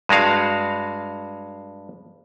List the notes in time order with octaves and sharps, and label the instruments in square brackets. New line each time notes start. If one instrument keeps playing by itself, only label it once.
[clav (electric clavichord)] G2 G#3 F#4 F5